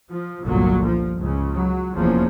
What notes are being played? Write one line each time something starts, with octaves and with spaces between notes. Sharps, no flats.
F3
G1 C2 A#2 D3 F#3
F3
C#2 C#3
F#3
F1 E2 F3 A#3 C#4